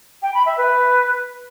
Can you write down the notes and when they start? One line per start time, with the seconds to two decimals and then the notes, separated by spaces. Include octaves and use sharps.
0.22 G5
0.33 B5
0.45 E5
0.57 B4